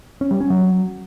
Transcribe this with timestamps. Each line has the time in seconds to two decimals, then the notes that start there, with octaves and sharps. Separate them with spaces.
0.21 C#4
0.31 G3
0.41 C#4
0.50 F#3